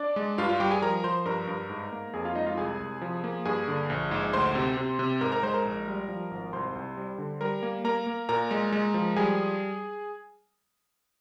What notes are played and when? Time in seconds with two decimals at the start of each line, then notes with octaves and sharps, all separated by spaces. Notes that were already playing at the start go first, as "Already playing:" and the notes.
Already playing: D4 D5
0.16 G#3
0.38 G2 F4 F5
0.49 F4 F5
0.60 G3 G4 G5
0.71 G#4 G#5
0.82 F3 A#4 A#5
1.04 F3 C5 C6
1.26 G2 A#4 A#5
1.47 G2
1.70 G#2
1.92 A#3
2.13 F2 G#4 G#5
2.25 F4 F5
2.35 G#3 D#4 D#5
2.46 F4 F5
2.57 C2 G#4 G#5
2.80 C2
3.01 F3
3.24 A#3
3.45 G2 G#4 G#5
3.68 D3
3.90 A#1
4.11 G#2
4.33 D2 C5 C6
4.55 C3
4.77 C3
4.99 C3
5.21 G#2 A#4 A#5
5.32 A#4 A#5
5.43 G#3 C5 C6
5.54 A#4 A#5
5.65 A#1
5.88 G3
6.09 F3
6.31 G#1
6.53 C2 C5 C6
6.75 C2
6.97 G3
7.18 D3
7.41 G3 A#4 A#5
7.63 A#3
7.84 A#3 A#4 A#5
8.07 A#3
8.29 A#2 A#4 A#5
8.51 G#3
8.73 G#3
8.94 F3
9.16 G3 G#4 G#5